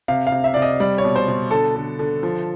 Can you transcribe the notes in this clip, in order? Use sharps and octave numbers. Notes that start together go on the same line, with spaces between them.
C3 F5
F5
C3
E5
C3 D5
D#5
G3 D5
C#5
B2
C5
B2
D3 A4
D3
D3
F3